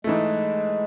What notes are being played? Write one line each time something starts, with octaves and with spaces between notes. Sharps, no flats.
G#2 E3 G#3 A3